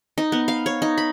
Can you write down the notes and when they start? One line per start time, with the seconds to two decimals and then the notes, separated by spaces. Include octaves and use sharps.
0.18 D#4
0.32 B3
0.48 F5
0.66 C#5
0.82 D#4
0.98 B5